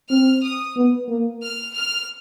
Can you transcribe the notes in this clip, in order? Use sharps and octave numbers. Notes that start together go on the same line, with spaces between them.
C4 F6
D#6
B3
A#3
F6
F6